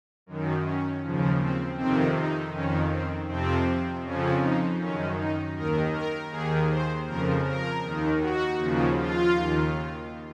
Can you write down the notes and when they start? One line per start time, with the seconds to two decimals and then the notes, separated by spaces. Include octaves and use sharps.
0.26 F#2 D#3
0.64 C#4
1.02 D#2 C#3 F3
1.40 C4
1.77 F2 C3 D#3 C4
2.16 D#4
2.53 F2 D#3 C#4
2.91 C4
3.28 F2 C3 F3 C4
4.04 F2 C#3 F3 C#4
4.42 D#4
4.80 F#2 D#3 C#4
5.18 D#4
5.55 D#2 D#3 A#4
5.94 A#4
6.31 D#2 D#3 G#4
6.69 C5
7.07 F2 C#3 F3 A#4
7.45 A#4
7.82 D#2 D#3
8.20 F#4
8.58 D#2 C#3 F3
8.96 F4
9.34 D#2 D#3